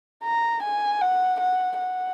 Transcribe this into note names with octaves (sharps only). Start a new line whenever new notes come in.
A#5
G#5
F#5
F#5
F#5